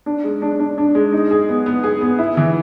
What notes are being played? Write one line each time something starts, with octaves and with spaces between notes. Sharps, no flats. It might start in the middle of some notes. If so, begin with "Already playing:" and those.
D4
G#3
D4
D4
D4
G#3
D#4
G#4
B3
B3
G#4
B3
E4
E3